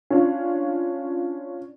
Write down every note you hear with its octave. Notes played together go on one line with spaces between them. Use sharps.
C#4 D4 F4